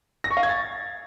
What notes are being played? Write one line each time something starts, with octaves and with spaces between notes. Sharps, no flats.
A#6
C#6
F5
G#6
A6